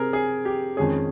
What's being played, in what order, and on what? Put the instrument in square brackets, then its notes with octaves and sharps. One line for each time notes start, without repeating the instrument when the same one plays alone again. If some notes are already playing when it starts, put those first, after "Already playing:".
Already playing: [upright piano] C3 C4 [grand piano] G#4 A#4
[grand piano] G#4
G4
[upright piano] F2 D#3 G#3 C#4 [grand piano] G#4